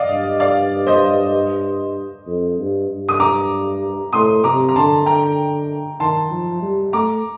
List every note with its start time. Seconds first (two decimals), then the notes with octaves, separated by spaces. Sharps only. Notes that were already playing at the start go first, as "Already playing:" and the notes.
Already playing: D5 D#5 F5
0.09 G2
0.40 D5 F5
0.87 C5 D#5
2.27 F2
2.58 G2
2.89 G2
3.09 D#6
3.20 A#5 D6
4.13 A2 C6 D#6
4.44 C3 A#5 D6
4.69 A#5
4.75 D3 A5 C6
5.06 D3 G5 A#5
6.00 D#3 A5 C6
6.31 F3
6.62 G3
6.93 A3 A#5 D6